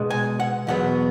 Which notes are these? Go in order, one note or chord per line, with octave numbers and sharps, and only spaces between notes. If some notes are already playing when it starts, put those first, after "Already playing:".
Already playing: B2 G#3 B3
G#5
F#5
E2 B2 F#3 B3 F#5